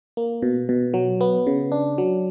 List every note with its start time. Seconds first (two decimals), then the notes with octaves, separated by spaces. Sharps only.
0.17 A#3
0.42 B2
0.69 B2
0.94 F#3
1.21 B3
1.47 C#3
1.72 D4
1.98 F#3